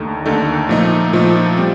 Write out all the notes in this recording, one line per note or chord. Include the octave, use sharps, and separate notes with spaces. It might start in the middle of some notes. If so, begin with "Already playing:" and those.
Already playing: D#2 D3 A3 D#4 A4
D#2 D3 A3 D#4 A4
A#2 F3 A3 D#4
A#2 F3 A3 D#4
G3 C4